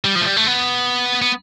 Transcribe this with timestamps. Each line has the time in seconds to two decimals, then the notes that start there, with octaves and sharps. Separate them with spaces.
0.05 G3
0.15 F3
0.21 A3
0.26 G3
0.36 A3
0.47 B3
1.22 B3